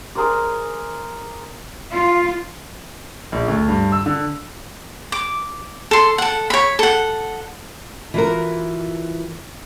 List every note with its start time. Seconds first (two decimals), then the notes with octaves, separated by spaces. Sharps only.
0.15 G#4 A#4 C5 D5
1.91 F4
3.32 A#1
3.48 D2
3.69 G2
3.92 E6
4.06 D3
5.12 D6
5.91 A4 C6
6.18 A4 F#5
6.50 C#5 B5
6.79 A4 F#5
8.14 E3 F4 F#4 A#4